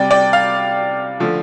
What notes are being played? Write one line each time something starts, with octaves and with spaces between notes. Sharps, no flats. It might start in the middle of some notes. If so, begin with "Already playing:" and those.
Already playing: C3 G3 D5 G5
D5 G5
F5
D3 F3 A3